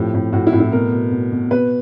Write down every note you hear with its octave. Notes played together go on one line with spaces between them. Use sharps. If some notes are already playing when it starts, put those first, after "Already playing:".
Already playing: A2 F3 G4
A2
A2 F#4
E4
A2
E4
B2 A#4
B2
B2
B2
B2 B4